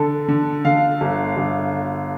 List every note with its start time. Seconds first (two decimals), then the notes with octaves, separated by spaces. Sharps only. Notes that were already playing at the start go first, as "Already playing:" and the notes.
Already playing: D3 A4
0.28 D3
0.65 D3 F5
1.01 G1
1.37 G1